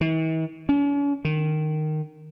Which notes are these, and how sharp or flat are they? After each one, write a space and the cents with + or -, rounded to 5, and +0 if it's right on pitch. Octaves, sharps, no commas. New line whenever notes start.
E3 -45
C#4 +45
D#3 -15